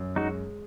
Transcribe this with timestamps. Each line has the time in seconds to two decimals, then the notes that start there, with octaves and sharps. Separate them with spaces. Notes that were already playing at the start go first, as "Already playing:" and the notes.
Already playing: F#2
0.16 G#3 D#4 F#4